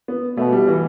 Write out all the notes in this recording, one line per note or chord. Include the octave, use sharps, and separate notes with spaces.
B3
B2 A3
G3
E3